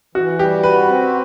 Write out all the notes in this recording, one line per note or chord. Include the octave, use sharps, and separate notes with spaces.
E3 F#4
G3 G4
F#4 B4
C4